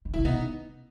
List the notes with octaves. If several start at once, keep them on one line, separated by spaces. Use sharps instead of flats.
D#3
C#3 E4
B2 B3 D#4